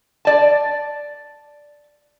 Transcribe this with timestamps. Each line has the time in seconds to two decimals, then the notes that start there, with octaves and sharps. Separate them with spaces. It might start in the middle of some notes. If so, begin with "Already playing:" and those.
0.25 D5 A5